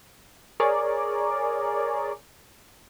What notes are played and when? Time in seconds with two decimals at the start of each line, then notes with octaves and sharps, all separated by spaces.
0.60 G#4 A#4 C#5 D5